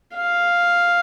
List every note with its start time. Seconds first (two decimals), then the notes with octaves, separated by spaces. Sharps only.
0.14 F5